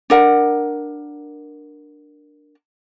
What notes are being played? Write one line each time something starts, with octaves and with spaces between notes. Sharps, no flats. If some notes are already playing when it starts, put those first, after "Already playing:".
D4 A#4 F#5